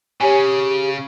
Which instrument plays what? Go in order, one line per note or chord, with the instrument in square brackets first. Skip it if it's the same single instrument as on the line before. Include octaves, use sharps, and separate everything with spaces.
[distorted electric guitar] C#3 [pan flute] G4 [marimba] C#5 G#5